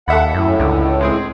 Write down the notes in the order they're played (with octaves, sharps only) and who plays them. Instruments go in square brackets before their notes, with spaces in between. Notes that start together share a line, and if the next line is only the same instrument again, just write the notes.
[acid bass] D#2 [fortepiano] A4 E5 B5 [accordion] F#5
[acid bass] F#2 [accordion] A2
[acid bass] C#2 [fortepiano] D3
[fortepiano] G#3 C4 G#4